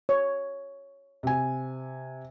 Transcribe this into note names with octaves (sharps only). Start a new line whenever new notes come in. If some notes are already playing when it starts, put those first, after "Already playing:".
C#5
C3 G#5